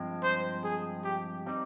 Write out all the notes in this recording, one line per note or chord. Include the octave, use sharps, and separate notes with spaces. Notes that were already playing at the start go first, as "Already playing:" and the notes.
Already playing: G2 F3 G#3 C4
C5
G#4
G4
G3 C4 D#4